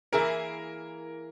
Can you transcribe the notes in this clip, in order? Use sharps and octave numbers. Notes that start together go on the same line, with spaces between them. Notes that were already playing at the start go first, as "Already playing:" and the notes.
E3 A#3 E4 G#4 A#4